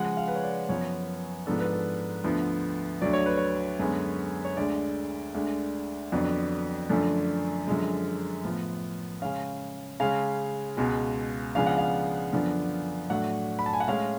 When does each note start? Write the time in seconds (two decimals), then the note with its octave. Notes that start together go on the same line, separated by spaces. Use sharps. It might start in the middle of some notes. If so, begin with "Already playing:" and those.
Already playing: C#3 F3 G#3 F#5
0.17 F5
0.28 B4
0.35 C#5
0.43 D5
0.69 F#2 F3 B3 C#5
1.46 G#2 F3 B3 D4 A4
1.60 B4
1.73 A4
2.24 D2 D3 F3 B3
3.01 D2 D3 F#3 D5
3.13 C#5
3.26 B4
3.37 C#5
3.79 F#2 D3 G#3 B3
4.45 C#5
4.57 D2 D3 G#3 D5
5.34 D2 D3 G#3 D4
6.12 F2 D3 F#3 B3 D4
6.89 F#2 D3 F3 A3 D4
7.67 F#2 D3 F3 G#3
8.45 A2 F3 B3
9.22 C#3 G#3 C#4 F5
10.00 C#3 G#3 C#4 F5
10.77 C#2 B2 G#3
11.55 C#3 F3 G#3 B3 D4 F5
11.66 F#5
11.78 F5
12.33 F#2 D3 F3 B3 D4
13.10 A2 F#3 A3 D4 F#5
13.59 B5
13.66 A5
13.73 G#5
13.80 F#5
13.87 A2 G#3 C#4 F5